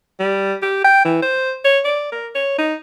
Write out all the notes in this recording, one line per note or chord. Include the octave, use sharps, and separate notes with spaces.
G3
G4
G5
E3
C5
C#5
D5
A#4
C#5
D#4